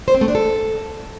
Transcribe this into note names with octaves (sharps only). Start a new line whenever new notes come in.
C5
C4
A3
D4
A4